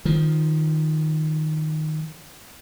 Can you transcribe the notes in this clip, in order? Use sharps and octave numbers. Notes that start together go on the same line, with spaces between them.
D#3 F3